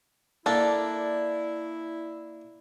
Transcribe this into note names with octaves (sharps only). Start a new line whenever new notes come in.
A#3 D4 E4 A4 D5